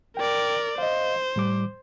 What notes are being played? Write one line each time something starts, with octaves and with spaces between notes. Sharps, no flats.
A#4 D5 G5
C5 D#5 F5
A2 G3 D6